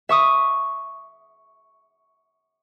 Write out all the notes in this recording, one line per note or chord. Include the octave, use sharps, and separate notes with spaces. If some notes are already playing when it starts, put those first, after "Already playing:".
E5 C#6 D#6